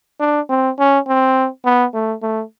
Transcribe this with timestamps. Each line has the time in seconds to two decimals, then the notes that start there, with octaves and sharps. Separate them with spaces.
0.20 D4
0.50 C4
0.79 C#4
1.08 C4
1.65 B3
1.94 A3
2.22 A3